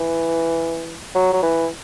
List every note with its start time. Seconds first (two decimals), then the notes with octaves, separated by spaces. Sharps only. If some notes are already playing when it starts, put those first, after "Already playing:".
Already playing: E3
1.15 F#3
1.33 F#3
1.43 E3